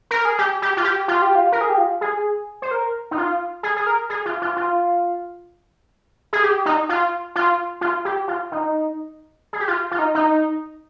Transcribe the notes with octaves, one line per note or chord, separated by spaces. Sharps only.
A#4
G#4
G4
G4
F4
G4
F4
G4
F4
A#4
G#4
G4
F4
G#4
C5
A#4
D#4
F4
G#4
G#4
A#4
G#4
F4
F4
F4
G#4
G4
D#4
F4
F4
F4
G4
F4
D#4
G#4
G4
F4
F4
D#4
D#4